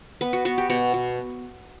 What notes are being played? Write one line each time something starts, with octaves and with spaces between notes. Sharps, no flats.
B3 B4
F#4
B3 F#4
G4
B2 F#4
B2